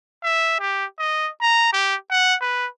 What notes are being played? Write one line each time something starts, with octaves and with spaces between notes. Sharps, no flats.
E5
G4
D#5
A#5
G4
F#5
B4